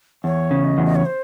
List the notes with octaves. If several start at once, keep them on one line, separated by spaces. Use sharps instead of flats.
E2 C#5
C#3
D#5
E2
D#5
C#5
C5